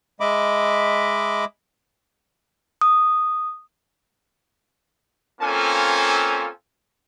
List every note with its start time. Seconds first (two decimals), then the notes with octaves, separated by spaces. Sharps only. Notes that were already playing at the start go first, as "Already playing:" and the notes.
0.20 G#3 D#5 E5 B5 D6
2.81 D#6
5.41 A#3 C4 C#4 F4 A4 G#5